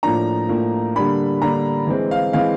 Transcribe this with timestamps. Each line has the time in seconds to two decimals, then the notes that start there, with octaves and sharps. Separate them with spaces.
0.03 A2 F3 A#3 D4 A#5
0.49 A2 F3 A#3 D4
0.95 D3 G3 A#3 D4 B5
1.42 D3 G3 A#3 D4 A#5
1.87 E3 G#3 C4
2.11 F5
2.33 E3 G#3 C4 F5